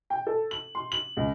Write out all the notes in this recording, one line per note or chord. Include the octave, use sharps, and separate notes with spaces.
G5
A4
F#7
C6
F#7
C#2